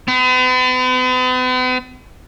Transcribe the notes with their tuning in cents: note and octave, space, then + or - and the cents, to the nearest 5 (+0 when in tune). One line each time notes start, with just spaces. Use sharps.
B3 +45